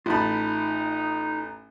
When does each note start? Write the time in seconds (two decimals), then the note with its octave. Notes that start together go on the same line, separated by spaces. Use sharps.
0.06 A1 D#4 F4 A5 B5